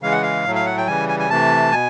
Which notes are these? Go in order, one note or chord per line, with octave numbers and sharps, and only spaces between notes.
C#3 E3 G#3 F5
F#5
F5
A2 F#3 A3
F5
F#5
G5
C#3 E3 G3 G#5
G#5
G#5
C3 E3 A3 A5
B2 G#5